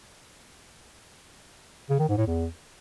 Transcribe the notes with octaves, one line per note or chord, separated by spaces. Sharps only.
C#3
D#3
G#2
A2
E2